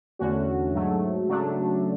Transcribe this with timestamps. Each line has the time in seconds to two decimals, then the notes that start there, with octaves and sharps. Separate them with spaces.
0.19 E2 D3 A3 C#4 F#4
0.74 G#2 F#3 A3
1.28 C#3 F#3 A3 D4